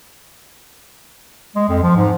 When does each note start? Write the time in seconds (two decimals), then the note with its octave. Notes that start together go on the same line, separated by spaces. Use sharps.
1.56 G#3
1.69 F2
1.83 F3
1.96 G#2